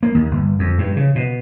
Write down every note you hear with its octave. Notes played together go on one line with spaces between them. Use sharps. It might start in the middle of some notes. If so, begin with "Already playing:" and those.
A#3
D#2
G1
F2
G2
C#3
B2